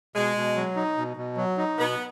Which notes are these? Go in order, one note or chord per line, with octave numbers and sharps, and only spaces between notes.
B2 G#3
B2
F#3
D#4
B2
B2
F#3
D#4
B2 B3